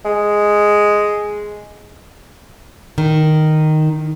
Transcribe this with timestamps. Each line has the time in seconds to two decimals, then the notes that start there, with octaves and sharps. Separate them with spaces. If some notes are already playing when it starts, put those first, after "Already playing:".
0.05 G#3
2.98 D#3